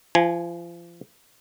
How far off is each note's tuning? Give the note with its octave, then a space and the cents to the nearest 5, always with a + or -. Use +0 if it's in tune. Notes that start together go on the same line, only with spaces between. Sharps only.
F3 -35 G#5 +0